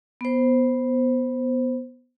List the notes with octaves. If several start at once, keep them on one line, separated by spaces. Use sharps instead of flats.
B3 C5